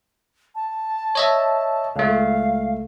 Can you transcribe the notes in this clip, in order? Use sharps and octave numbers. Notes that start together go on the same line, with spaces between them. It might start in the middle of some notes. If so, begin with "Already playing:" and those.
A5
C#5 D#5 E5
C#2 A3 F5